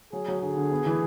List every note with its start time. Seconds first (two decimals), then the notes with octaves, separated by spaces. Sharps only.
0.12 F#3 G#4
0.28 F#3
0.42 D3 G#4
0.57 D3
0.71 B3
0.86 E3